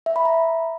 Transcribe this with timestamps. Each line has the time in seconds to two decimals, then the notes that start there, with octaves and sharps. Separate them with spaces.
0.06 E5
0.16 B5
0.25 A#5